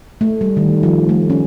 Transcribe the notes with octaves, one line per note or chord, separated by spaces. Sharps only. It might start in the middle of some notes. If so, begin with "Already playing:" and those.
A3
G3
D#3
F3
A3
C#4